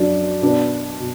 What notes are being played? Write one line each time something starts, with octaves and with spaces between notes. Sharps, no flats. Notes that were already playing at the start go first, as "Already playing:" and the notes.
Already playing: F#2 F#3 D4 D5
B2 B3 D4
B2